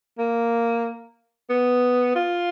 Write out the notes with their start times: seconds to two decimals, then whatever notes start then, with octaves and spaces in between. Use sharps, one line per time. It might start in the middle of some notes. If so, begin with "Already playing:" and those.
0.19 A#3
1.50 B3
2.15 F4